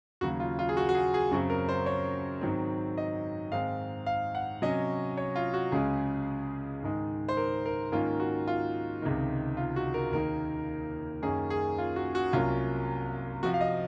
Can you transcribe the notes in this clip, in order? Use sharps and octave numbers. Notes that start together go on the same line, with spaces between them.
D#2 C#3 F#3 F#4
F4
F4
G#4
F#4
F#4
G#4
G#4
F#2 C#3 F#3 C4 F#4
A#4
C5
C#5
G#2 D#3 F#3 C4
D#5
G#2 D#3 G#3 C4 F5
F5
F#5
C3 F#3 C#4 D#5
C#5
F4
F#4
C#2 C#3 G#3 C#4 G#4
G#2 D#3 G#3
C5
A#4
A#4
G#2 D#3 A#3 C#4 F4
F#4
F4
C#2 C3 D#3
F4
F#4
A#4
D#2 D#3 A#3 A#4
F#2 D#3 A#3 C#4 G#4
G#4
F4
F#4
F#4
C2 C3 F#3 A#3 C#4 F4
C3 F3 C4 F#4
F5
D#5